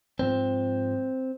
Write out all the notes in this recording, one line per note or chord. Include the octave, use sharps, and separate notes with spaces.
G#2 F3 C4